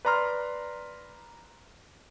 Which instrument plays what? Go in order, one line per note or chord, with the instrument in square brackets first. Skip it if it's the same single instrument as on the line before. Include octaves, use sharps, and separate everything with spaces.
[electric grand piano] B4 D5 A#5 C6 F6